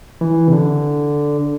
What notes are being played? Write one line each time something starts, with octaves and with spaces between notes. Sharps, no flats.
E3
C3
D3